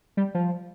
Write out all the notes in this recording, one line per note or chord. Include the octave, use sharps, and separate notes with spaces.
G3
F3